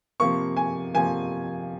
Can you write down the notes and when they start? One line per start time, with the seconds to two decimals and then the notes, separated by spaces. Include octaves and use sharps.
0.20 C3 F3 A#3 C#6
0.57 G#5
0.95 C3 F3 A#3 G#5